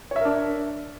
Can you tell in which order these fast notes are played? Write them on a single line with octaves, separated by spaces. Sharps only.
C#5 E5 A#4 D4